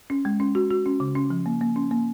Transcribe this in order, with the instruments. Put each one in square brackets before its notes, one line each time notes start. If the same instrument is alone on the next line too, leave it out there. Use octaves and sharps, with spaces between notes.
[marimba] C#4
G#3
C#4
F#4
F#4
C#4
C#3
C#4
F3
A#3
A#3
C#4
A#3